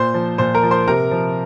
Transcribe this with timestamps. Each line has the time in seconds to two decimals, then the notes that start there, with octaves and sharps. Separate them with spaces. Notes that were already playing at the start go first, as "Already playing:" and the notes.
Already playing: A#2 C5 C6
0.14 F3
0.38 A#2 C5 C6
0.55 A#4 A#5
0.63 F3
0.71 C5 C6
0.88 C3 A#4 A#5
1.11 F3